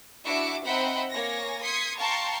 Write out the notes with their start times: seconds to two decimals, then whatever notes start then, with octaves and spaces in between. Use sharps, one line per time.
0.24 D4 E4 F#4 E5 D6 C#7
0.63 C4 D#4 E5 F#5 G5 B5
1.11 A#3 C#5 G#5 A#6
1.61 C6 D#6 G#6 B6 C#7
1.97 F5 G5 A5 A#5 C6 C#6